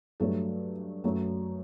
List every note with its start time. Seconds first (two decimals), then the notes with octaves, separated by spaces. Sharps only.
0.20 G2 F#3 A3 A4
1.04 F#2 F#3 A3